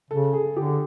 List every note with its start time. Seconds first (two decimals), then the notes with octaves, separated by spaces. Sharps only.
0.10 C#3 A4
0.33 G#4
0.56 D3 G4